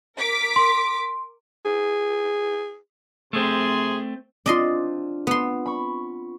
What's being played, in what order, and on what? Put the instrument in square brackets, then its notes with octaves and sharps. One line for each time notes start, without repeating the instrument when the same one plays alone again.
[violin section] A#4 D6 B6
[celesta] C6
[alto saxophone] G#4
[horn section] C3 G#4 C6 [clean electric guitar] A3 C4
[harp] C4 D4 F4 [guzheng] D5 D#5 C6
[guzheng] B3 C6
[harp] B5 C#6